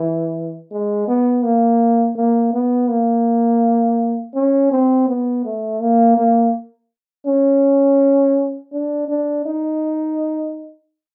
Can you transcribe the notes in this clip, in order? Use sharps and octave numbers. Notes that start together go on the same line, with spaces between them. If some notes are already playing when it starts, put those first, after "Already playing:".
Already playing: E3
G#3
B3
A#3
A#3
B3
A#3
C#4
C4
B3
A3
A#3
A#3
C#4
D4
D4
D#4